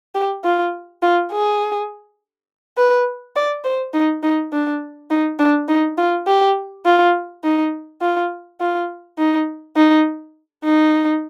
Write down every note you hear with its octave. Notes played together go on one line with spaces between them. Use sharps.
G4
F4
F4
G#4
B4
D5
C5
D#4
D#4
D4
D#4
D4
D#4
F4
G4
F4
D#4
F4
F4
D#4
D#4
D#4